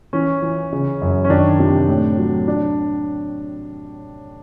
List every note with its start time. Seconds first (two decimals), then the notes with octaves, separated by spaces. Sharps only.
0.13 E3 C#4
0.42 E3
0.73 C#3
1.02 F#2
1.25 C#4
1.30 D#3 D4
1.59 C3
1.89 A2
2.18 F#3
2.48 D4